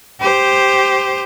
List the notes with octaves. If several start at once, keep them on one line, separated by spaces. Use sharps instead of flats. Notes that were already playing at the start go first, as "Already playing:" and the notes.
G4 C5